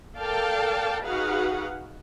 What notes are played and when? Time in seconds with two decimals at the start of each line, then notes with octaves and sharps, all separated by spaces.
0.18 A4 A#4 D5 F5 G5 A5
1.04 D#4 F#4 G#4 B4 F5 F#5